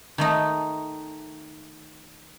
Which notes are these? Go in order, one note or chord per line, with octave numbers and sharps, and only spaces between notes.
D#3 A3 D#4